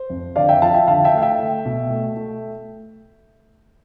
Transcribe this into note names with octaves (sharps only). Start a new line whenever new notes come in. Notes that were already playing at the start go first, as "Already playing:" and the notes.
Already playing: C5
F2
D3 D5 F5
E5 G5
F3 F5 A5
E5 G5
D3 F5 A5
E5 G5
A3 F5
E5 G5
A3
B2
A3
A3